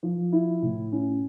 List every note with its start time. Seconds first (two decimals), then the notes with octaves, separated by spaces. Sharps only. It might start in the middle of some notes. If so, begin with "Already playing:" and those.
0.03 F3
0.32 E4
0.62 A2
0.92 C#4